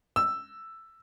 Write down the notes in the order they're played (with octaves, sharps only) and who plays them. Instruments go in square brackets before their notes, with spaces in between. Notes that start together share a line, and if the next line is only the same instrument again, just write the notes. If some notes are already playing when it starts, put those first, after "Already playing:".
[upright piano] E6